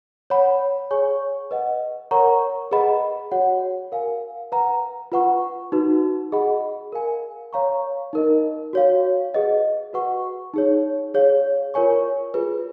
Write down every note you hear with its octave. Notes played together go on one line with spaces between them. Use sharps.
C#5 F#5 B5
G#4 C#5 G#5 C#6
B4 D#5 F#5
A#4 C#5 F#5 A#5 C#6
G#4 B4 D#5 F#5 B5
F#4 C#5 F#5
A#4 F5 G#5
B4 F#5 A#5
F4 B4 F#5 C#6
D#4 F#4 B4
G#4 D#5 F#5 B5
A#4 F5 G#5
C#5 F5 A#5 C#6
D#4 A#4 D#5
F#4 C#5 F5
G#4 B4 D#5 F#5
F#4 B4 F#5 C#6
D#4 G#4 C#5
G#4 C#5 F5
F4 A#4 C#5 G#5 C#6
F4 G#4 B4